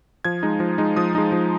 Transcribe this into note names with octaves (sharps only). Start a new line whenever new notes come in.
F3 G#6
G#3 D#4
F3
G#3 D#4
F3 D#6
G#3 D#4
F3